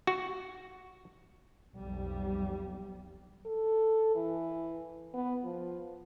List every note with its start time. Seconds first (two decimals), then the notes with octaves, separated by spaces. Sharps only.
0.07 F#4
1.75 B1 F2 G3
3.45 A4
4.15 E3
5.14 B3
5.44 F3